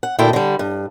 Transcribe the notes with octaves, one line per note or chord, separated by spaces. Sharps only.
F#5
D2 A#2 E4 A4 G5
D3 G3
G2